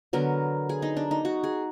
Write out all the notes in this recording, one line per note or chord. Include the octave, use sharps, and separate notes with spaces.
D3 F#3 B3 A#4
G#4
D#4
D4
D#4
F#4
G#4